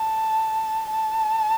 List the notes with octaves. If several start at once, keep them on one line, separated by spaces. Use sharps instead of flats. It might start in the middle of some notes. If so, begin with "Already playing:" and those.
Already playing: A5
A5